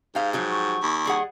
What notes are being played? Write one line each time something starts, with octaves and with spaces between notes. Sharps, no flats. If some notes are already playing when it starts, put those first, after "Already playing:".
G#2 G4 F5
F3 F#3 G4
C#6
D#2
G3 G#4 F#5